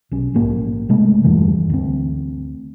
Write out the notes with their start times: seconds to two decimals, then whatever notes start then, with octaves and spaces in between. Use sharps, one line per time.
0.11 B1 C#4
0.34 A#1 G#2 A#3
0.89 C3 G#3 A3
1.24 E2 G2 D3 E3
1.70 D2 C4